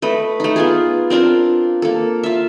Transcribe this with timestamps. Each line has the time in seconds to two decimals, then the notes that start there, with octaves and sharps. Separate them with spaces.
0.02 A3 B4 D#5
0.40 A3 D#4
0.56 B3 F4 G#4
1.10 C4 D4 F4 A#4
1.82 A#3 A4
2.24 F4 E5